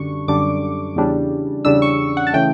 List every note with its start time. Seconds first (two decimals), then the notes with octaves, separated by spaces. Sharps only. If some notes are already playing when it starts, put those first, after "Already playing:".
Already playing: F#2 D3 G3 D4 C#6
0.28 F#2 D3 G3 D4 D6
0.96 E2 C#3 G3 D4
1.65 E2 C#3 G3 D4 E6
1.82 C#6
2.17 F#5
2.27 A5
2.33 C#3 E3 A3 G5